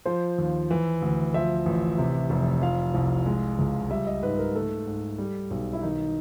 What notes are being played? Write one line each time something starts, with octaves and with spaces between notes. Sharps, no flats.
F3 C5
D#2
E3
D2
F3 E5
A1
C3
F1
F3 F5
C2
G#3
C#2
G3 E5
D#5
G#2 B4
A#4
A3 A4
G#2
G3
B1
E4
D#3 D#4